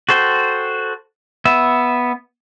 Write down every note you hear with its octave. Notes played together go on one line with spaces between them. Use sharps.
F#4 A4 C5 G5
B3 E5